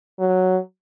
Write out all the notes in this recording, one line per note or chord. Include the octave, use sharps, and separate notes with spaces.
F#3